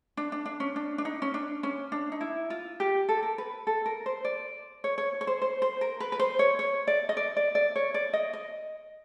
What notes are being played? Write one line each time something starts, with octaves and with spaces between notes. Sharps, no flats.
D4
D4
D4
C#4
D4
D4
D#4
C#4
D4
C#4
D4
D#4
E4
F4
G4
A4
A#4
B4
A4
A#4
C5
D5
C#5
C#5
C#5
C5
C5
C5
A#4
B4
B4
C5
C#5
C#5
D5
D#5
D5
D5
D5
C#5
D5
D#5
D#5